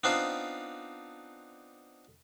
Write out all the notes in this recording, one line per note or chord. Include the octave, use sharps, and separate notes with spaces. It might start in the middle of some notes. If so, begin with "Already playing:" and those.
B3 C4 D4 D#4 F4 C5